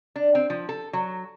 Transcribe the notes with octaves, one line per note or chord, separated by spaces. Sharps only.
D4
C4
F3
A4
F#3